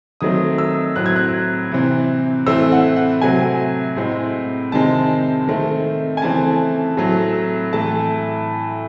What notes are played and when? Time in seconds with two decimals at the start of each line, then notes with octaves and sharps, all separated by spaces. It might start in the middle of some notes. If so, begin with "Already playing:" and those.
0.21 D#3 F#3 A3 C4 D#6
0.58 E6
0.96 A2 F#3 C4 F#6
1.06 G#6
1.16 F#6
1.71 C3 E3 C4
2.46 A2 E3 A3 C4 E6
2.72 F#5
2.96 F#5
3.22 C3 F#3 A3 C4 G#5
3.96 A2 G#3 C4
4.72 C3 D#3 G#3 C4 A5
5.47 D#3 A3 C4
6.17 G#5
6.22 C#3 E3 A3 C4 A5
6.97 A2 F#3 A3 C4
7.73 A2 E3 A3 A5